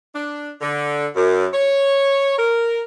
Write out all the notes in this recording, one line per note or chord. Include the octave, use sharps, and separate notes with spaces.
D4
D3
F#2
C#5
A#4